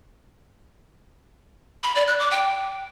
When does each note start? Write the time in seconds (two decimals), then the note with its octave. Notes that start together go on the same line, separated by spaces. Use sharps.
1.84 B5
1.95 D5
2.07 F#6
2.19 D6
2.31 G5